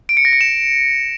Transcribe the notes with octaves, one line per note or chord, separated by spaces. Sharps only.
D7
C#7
A#6
C#7
E7